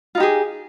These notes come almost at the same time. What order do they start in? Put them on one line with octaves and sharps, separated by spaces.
F4 D#4 G4 G#4